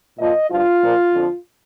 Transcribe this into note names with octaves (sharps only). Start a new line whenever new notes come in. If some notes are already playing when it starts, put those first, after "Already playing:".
A#2 F3 D#5
G2 F3 F4
A#2 F3
F2 D3 F3